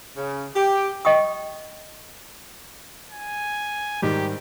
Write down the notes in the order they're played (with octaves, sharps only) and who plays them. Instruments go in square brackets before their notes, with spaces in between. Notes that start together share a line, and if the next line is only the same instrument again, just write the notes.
[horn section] C#3
G4
[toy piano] D#5 G5 C#6 D#6
[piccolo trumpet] G#5
[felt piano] G#2 D#3 G3 [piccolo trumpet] G4